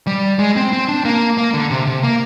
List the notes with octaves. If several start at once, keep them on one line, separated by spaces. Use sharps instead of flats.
G3
G#3
C4
C4
D4
A#3
A#3
D3
C3
C3
A#3